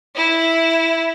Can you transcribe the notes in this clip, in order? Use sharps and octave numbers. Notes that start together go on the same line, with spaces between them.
E4